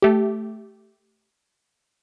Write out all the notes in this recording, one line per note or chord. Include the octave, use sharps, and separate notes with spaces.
A3 G4